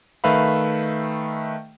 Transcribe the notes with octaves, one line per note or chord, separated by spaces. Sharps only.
D#3 A3 B4 E5 F5 B5